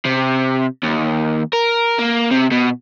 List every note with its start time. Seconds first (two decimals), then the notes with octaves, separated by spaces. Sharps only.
0.05 C3
0.83 D#2
1.53 A#4
1.99 A#3
2.31 C3
2.52 B2